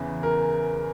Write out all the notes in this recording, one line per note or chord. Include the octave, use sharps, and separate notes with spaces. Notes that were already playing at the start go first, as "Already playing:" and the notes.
Already playing: E2 C#3 E3
A#4